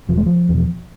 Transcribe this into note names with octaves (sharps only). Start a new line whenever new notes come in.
E1 F3
G#3
F3
E2 B2